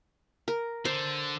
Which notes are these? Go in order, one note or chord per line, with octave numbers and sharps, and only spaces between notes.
A#4
D3 C5